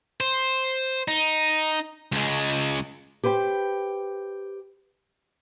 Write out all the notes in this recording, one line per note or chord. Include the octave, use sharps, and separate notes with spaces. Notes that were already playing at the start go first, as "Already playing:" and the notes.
C5
D#4
C#2 G#3
G4 B4 C5 F#5 G5